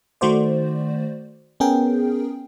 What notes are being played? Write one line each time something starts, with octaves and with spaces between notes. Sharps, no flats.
D#3 A3 F#4 C5 D5
B3 C#4 G#4 A#4 G5